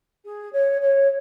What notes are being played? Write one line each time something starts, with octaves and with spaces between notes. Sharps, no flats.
G#4
C#5
C#5